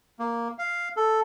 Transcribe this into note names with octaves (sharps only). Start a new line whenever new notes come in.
A#3
F5
A4